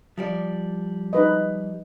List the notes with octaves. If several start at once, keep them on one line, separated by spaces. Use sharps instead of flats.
F3 G3 D5
D#4 B4 D#5